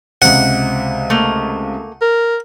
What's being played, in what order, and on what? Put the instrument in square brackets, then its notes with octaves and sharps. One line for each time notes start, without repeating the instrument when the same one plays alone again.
[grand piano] C#2 C3 [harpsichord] F#5
[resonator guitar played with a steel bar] A3 A#3
[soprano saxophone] A#4